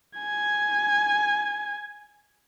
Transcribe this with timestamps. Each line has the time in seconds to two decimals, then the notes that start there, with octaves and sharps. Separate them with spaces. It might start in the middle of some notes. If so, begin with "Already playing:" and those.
0.19 G#5 G#6